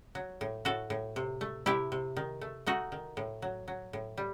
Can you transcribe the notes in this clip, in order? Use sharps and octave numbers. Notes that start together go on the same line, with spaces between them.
F#3
A2
A2 F#4 A4
A2
C3
A3
C3 E4 G4
C3
D#3
A3
A3 D#4 F#4
D#3
A2
F#3
F#3
A2
G3